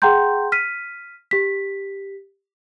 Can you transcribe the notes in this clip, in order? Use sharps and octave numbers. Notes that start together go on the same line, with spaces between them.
G#4 F#5 G5 A#5 C6 G6
F6 B6 D#7
G4 B6